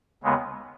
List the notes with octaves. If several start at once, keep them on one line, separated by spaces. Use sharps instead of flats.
D#2 C#3 G#3 B3